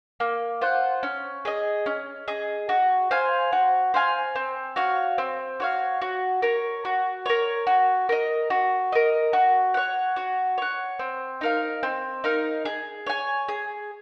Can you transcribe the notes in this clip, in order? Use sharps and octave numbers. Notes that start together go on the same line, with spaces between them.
A#3
F4 C5 F#5
C#4
G#4 D#5
C#4
G#4 D#5
F#4
C5 F5 G#5
F#4
C5 F5 G#5
C4
F#4 C#5 F5
C4
F#4 C#5 F5
F#4
A#4 C#5
F#4
A#4 C#5
F#4
A#4 D#5
F#4
A#4 D#5
F#4
C#5 F#5
F#4
C#5 F#5
C4
D#4 A#4 F5
C4
D#4 A#4 F5
G#4
C#5 G#5
G#4